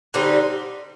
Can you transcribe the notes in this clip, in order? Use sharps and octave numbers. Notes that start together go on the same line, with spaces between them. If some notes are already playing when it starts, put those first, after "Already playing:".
D3 G3 C4 D#4